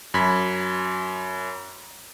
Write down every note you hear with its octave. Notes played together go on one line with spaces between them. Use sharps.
F#2 B5 G#6 B6